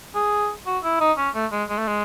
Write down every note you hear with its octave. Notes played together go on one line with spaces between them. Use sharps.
G#4
F#4
E4
D#4
C#4
A3
G#3
G#3
A3
G#3